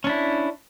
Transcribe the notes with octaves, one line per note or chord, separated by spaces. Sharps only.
C#4 D4 E4